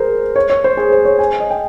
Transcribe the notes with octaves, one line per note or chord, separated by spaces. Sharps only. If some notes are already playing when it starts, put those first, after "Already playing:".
Already playing: G#4 A#4 C5
C#5
C#5
C5
G#4
C5
C#5
G#5
D#5
G5